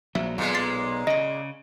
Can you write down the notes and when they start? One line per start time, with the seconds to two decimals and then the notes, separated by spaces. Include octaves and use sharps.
0.15 A#1 F#3 E5
0.38 B1 A#2 G#3
0.55 A6 C7
1.07 C#3 D#5 A#6